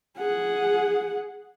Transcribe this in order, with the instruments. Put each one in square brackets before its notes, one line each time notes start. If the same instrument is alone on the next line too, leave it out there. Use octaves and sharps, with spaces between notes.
[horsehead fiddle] G#4 F#5